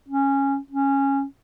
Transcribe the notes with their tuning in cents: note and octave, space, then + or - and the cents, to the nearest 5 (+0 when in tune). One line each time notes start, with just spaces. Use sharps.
C#4 -10
C#4 -10